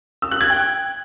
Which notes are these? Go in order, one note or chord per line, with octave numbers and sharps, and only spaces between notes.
E6
F#6
G#6
G5